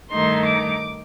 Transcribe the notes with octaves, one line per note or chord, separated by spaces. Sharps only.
G2 D#3 A3 D#4 C6
D6